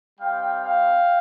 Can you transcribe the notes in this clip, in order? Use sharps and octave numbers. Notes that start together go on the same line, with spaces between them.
G3 C4 D#4 F5 G5
F5 G5